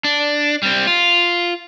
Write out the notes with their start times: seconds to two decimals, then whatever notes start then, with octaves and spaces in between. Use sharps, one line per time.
0.04 D4
0.63 G3 C4
0.87 F4